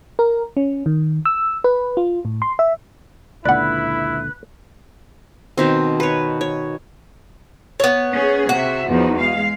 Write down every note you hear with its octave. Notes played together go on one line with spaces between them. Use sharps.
A#4
C#4
D#3
E6
B4
F4
A2
C6
E5
C#2 A#2 D3 E4 B4 D5 F#5
B2 D#3 C4
B4 C#5
C#5
B3 C#5
C#4 G#4
C3 F#4 E5
E2 F3 D#4
G#3 F5